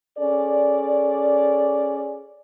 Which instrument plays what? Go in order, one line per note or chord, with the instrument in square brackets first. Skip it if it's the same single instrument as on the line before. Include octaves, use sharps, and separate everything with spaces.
[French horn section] C#4 G#4 A4 D5